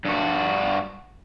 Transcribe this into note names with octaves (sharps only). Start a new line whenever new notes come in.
G2 F#4